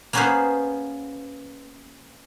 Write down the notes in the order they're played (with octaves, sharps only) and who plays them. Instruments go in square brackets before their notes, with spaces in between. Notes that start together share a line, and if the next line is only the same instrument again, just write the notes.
[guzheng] A#3 B3 C#4 G#4 B4 C5